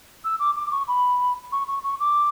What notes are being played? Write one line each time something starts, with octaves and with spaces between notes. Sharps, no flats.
E6
D6
D6
C#6
B5
C#6
C#6
C#6
D6